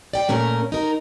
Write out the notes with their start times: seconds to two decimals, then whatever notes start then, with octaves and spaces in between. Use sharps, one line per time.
0.13 D5 G5
0.28 A#2 A3 C#4 A#4
0.72 D#4 A#4